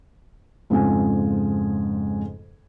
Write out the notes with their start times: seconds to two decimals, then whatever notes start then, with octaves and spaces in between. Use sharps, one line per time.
0.70 F2 G#2 C#3 F4 G#5